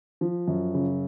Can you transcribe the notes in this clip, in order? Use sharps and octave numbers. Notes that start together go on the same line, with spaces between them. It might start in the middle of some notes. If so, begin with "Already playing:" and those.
F3
F#2
C#3